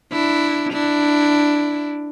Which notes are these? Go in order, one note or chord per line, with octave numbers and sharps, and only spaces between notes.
D4 E4
D4 E4